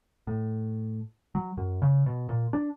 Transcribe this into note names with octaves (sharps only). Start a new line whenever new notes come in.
A2
F#3
F#2
C#3
B2
A#2
D4